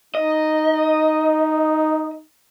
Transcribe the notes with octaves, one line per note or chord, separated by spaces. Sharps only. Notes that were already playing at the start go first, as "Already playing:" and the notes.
D#4 D#5